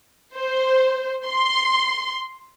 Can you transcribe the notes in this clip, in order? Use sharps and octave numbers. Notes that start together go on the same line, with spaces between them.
C5
C6